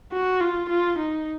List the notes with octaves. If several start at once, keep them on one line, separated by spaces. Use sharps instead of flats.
F#4
F4
F4
D#4